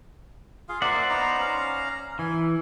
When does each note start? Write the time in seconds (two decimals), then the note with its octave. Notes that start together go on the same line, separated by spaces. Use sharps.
0.69 F4 G#4 F5
0.82 A#3 C5 D5 E5 F#5
1.09 B3 D#4 A#5
1.38 C#4 F5 A#5
2.19 E3 G#5